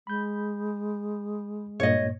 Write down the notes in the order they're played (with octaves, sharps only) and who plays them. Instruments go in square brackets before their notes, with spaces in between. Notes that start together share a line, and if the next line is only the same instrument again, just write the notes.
[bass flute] G#3 [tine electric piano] B5 G6
[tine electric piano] G2 A#2 A#3 [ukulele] C#5 D#5